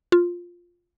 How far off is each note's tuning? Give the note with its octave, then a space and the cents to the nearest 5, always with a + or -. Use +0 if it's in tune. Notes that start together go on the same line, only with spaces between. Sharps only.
F4 +5